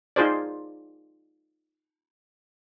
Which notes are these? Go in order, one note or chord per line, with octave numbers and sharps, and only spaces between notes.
D#4 F4 G#4 C5 D5